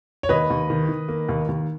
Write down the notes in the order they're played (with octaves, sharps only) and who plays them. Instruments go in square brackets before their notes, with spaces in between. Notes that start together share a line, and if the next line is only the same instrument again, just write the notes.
[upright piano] C#5
D#2 B4 D#5
D#2
D#3
D#3
A#3
D#2
D#2